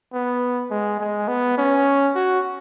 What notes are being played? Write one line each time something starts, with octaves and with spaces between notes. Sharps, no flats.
B3
G#3
G#3
B3
C#4
F#4